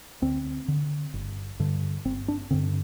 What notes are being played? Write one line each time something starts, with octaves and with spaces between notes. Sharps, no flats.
D2 C4
D3
G1
G2 D3
G1 C4
D4
G2 D3 C4